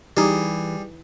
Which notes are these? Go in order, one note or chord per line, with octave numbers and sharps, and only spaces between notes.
E3 G3 D#4 G4 G#4